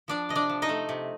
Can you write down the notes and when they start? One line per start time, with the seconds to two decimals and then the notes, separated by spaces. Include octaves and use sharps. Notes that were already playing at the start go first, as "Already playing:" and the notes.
0.08 F3 D4 D5
0.29 C3 D#5
0.35 D4 D5
0.49 F3
0.62 D#4 D#5
0.69 A3
0.89 C3